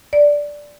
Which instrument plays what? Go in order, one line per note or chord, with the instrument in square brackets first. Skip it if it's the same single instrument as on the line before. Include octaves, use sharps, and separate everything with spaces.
[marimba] D5